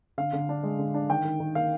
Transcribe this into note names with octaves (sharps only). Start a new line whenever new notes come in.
D3 F5
D3
D4
G#3
D3
D4
D#3 G5
D#3
D#3
A#3 F5